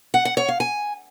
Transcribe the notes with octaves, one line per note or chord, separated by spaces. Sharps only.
F#5
F#5
C#5
F5
G#5